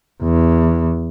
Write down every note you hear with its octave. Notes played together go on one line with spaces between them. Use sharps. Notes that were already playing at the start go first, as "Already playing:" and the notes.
E2